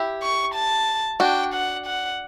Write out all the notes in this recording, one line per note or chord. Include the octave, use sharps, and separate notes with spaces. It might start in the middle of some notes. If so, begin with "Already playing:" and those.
Already playing: E4 G4
C#6
A5
D4 F#4 G5
F#5
F#5